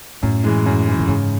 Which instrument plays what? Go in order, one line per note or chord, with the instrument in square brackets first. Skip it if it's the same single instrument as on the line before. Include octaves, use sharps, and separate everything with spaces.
[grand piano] F#2 [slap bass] A2
[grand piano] E3 G#3
F#2
E3 G#3
[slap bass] A2
[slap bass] G#2 [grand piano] C#3